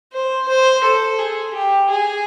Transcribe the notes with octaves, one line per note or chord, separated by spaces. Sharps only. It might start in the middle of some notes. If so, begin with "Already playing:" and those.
C5
C5
A4
G#4
G4
G#4